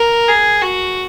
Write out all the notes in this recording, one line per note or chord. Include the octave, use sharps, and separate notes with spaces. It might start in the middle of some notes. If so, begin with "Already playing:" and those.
Already playing: A#4
G#4
F#4